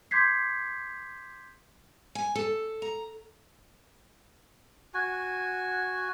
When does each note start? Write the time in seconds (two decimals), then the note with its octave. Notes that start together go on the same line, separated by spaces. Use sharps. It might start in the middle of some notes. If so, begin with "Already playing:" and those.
0.11 C6 D6 G6 G#6 B6 C7
2.15 G#5
2.35 A4
2.82 A#5
4.94 F#4 G#5